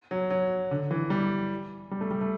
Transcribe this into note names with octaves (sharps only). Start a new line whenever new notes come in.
F#3
F#3
D3
E3
G3
G3
A3
G3
A3